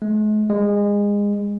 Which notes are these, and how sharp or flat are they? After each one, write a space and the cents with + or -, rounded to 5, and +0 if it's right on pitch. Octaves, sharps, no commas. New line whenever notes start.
G#3 +45
G#3 -25